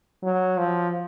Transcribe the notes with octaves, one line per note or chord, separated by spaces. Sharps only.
F#3
F3